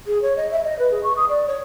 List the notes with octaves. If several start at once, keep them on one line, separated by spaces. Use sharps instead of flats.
G#4
C#5
D#5
E5
D#5
B4
G#4
C#6
D#6
D5
C#5